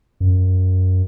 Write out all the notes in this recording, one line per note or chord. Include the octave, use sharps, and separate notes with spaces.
F#2